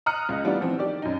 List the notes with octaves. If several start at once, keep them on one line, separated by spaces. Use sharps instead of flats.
A#5 D#6 F6 F#6 C#7
C#2 D#5
E3 G3 B3 D4 F4
E3 F3 C4
D#3 G4 D5
F#2 D#4